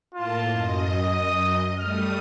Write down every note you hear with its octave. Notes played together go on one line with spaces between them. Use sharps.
A2 A#3 F4 A5
F#2 D#5
D#6
G3 A3 D#6 F6